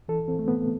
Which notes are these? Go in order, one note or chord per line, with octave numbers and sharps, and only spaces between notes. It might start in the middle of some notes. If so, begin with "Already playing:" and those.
E3 A4
E3 C4
A3
A2 B3